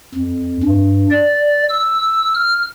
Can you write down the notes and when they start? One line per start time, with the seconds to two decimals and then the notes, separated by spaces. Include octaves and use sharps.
0.15 F2
0.63 G2
1.10 D5
1.69 E6
2.34 F6